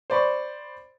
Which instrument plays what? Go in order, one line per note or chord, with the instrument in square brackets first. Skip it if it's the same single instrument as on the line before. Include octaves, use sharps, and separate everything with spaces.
[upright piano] C5 D5 B5 C#6